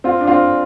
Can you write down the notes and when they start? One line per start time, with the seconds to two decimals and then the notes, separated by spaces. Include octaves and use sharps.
0.04 C4 F4
0.21 D4
0.27 C4 F4